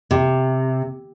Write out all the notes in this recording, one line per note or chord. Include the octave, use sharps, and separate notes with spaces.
C3